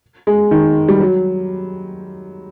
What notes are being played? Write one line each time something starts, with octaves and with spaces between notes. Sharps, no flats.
G#3
D#3
G3
F#3